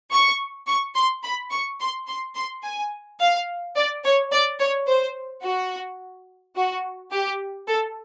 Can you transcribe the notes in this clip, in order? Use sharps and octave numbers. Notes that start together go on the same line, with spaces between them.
C#6
C#6
C6
B5
C#6
C6
C6
C6
G#5
F5
D5
C#5
D5
C#5
C5
F#4
F#4
G4
A4